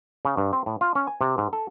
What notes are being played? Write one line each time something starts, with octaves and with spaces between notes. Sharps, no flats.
C#3
G2
C4
A2
F4
C#4
G#5
C3
G#2
A4